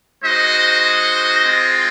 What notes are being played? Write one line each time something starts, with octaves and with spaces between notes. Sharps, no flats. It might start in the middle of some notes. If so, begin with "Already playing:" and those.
G#3 D#4 F#4 C5 D#5
G#3 C4 F4